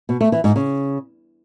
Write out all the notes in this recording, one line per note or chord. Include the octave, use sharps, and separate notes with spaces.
B2
A3
E3
G#2
C#3